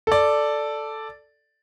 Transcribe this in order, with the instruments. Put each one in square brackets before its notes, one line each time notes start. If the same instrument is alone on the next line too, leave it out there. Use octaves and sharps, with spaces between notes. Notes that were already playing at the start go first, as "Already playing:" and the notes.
[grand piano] A4 D5